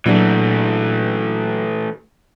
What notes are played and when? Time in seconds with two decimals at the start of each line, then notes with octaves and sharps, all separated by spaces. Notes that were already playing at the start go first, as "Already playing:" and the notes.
0.06 A#2 E3 F#3 A3 D4 G#4